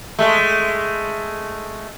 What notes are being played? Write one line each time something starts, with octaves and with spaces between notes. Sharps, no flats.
G#3 A3